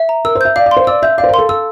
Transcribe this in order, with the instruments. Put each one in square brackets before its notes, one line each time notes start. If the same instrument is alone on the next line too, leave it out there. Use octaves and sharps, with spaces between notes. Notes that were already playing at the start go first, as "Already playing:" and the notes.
Already playing: [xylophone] E5
A#5
[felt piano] A#4 [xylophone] E6
[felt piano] C5
[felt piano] E5 [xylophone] G6
[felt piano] D5 [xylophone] F5
[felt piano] D5
[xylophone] C6
[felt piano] C5
[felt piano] D5 [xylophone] E6
[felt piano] E5 [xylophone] G6
[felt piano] D5 [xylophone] F5
[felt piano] C5
A#4
[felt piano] A4 [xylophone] C6
[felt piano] A4 [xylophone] E6